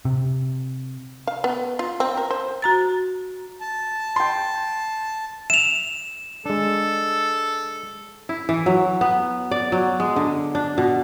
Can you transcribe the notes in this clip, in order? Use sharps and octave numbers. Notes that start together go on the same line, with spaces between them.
C3
F5
B3
F4
C4
A#4
C5
F#4 A#5 A6
A5
G5 C6
E5 E7 F7
G#3 D4 A4
E4
E3
F#3
B3
D5
F#3
G#3
D3
D4
B2